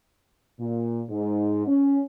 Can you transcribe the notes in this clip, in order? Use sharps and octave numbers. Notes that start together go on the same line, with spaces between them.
A#2
G#2
C#4